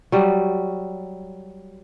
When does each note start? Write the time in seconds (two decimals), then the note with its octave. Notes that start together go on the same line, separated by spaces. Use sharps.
0.12 F#3 G3